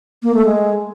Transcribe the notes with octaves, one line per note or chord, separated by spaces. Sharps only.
A#3
A3
G#3